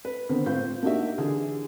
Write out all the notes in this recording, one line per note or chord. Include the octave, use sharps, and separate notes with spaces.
B4
D3 D#3 B3 C4 D#4
A2 C4 F4 C5 G6
A#3 D4 D#4 F#4 G4 E5
D3 E3 G4 G#4